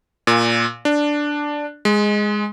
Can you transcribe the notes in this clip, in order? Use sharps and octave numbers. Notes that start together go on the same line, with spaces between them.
A#2
D4
G#3